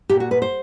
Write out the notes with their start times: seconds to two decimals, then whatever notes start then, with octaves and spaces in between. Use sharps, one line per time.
0.09 A#2 G4
0.20 F#4
0.31 B4
0.42 C5